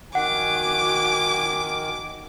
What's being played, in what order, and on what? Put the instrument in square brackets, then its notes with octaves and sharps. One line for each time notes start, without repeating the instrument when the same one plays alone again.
[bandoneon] D#3 [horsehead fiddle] F#4 G#5 [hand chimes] F#5 [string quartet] D6